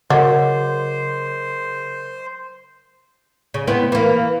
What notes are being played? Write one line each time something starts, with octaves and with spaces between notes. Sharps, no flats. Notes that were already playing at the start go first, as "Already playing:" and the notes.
C#3 F#3 A#4 C5 D#5 D6
C#3
B3 C4 E4
E3 A#3